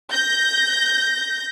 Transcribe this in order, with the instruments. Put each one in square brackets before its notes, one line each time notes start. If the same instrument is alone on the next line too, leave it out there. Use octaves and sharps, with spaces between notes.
[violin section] G6 A#6